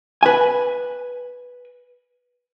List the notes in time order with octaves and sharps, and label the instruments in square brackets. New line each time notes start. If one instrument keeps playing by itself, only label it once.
[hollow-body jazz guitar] B4 G#5